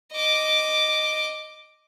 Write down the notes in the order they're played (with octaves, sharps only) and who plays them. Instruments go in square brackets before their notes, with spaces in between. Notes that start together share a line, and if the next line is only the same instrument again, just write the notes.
[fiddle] D#5 D6